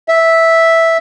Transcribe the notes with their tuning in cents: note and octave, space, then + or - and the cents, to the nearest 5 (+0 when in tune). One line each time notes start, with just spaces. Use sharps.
E5 -5